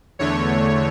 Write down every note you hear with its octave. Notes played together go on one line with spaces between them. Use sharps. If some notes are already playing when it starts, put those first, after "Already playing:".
E2 D3 A3 C#5